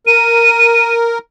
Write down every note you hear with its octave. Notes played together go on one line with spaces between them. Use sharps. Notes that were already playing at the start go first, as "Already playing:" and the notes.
A#4 D#7